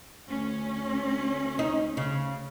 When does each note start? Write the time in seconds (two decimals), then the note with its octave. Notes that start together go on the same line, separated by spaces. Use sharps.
0.27 D2 C#4
1.59 D#4
1.97 C#3